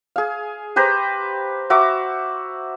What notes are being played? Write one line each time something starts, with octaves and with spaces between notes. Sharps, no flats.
G#4 F5
G4 B4 C5 A#5
F#4 E5 A#5 D6